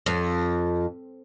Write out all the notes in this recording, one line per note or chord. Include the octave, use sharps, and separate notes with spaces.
F2